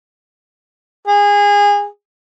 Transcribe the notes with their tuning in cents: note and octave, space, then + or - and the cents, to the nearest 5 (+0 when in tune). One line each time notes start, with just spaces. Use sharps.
G#4 -25